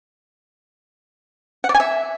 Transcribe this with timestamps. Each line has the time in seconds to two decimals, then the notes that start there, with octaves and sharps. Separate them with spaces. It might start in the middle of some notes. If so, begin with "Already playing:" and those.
1.64 F#5
1.69 D5
1.75 G#5
1.80 E5